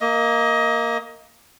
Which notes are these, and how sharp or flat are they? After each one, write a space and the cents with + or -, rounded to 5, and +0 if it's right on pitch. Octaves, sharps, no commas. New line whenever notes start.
A#3 +0 D#5 +25